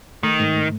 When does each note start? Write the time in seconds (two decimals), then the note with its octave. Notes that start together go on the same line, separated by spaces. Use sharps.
0.23 D#3 A3
0.40 G#2